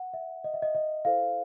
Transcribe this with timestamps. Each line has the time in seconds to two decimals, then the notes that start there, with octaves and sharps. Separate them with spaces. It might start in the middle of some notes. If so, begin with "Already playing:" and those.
Already playing: F#5
0.14 E5
0.44 D#5
0.54 E5
0.62 D#5
0.75 D#5
1.05 E4 A4 C5 F5